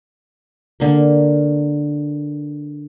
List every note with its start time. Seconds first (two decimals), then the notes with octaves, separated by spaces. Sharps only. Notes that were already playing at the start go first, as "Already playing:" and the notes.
0.80 D3 A#3